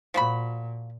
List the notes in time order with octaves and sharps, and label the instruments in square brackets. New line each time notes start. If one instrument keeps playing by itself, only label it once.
[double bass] A#2 [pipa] F3 F#4 B5